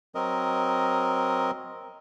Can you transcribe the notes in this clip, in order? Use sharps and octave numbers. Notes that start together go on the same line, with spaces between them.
F#3 C4 A#4 D#5